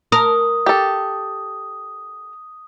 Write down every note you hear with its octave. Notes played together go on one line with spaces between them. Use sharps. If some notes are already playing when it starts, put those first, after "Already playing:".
A#4 D#6
G4 A4